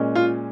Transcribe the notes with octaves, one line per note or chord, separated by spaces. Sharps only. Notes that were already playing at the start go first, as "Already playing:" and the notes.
Already playing: A#2 G#3 C#4
F4